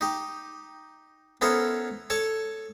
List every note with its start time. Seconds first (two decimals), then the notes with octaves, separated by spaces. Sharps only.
0.01 D#4 G4
1.41 B3 C#4 E4 A4 A#4 C5
2.10 A4 C#5 A5